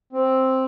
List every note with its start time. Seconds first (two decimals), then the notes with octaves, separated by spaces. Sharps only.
0.13 C4